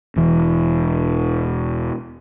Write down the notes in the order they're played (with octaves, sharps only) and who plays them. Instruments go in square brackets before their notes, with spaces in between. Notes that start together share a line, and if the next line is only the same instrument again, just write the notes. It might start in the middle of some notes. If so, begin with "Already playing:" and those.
[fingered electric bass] E1 E3